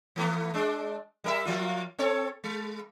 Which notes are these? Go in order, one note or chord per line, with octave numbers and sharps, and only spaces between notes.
E3 A3 B3
G#3 D4
G3 A#4 E5
F3 A#3 F4
C4 A4 C#5
G#3